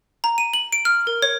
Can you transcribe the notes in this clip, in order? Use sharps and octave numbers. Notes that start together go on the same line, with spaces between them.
A#5
D#7
F#7
D7
F6
A#4
C#5